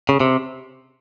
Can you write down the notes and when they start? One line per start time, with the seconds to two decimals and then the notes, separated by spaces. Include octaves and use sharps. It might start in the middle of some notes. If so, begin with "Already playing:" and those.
0.09 C#3
0.20 C3